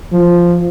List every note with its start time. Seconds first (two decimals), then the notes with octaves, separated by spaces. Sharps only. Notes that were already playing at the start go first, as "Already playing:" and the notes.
0.13 F3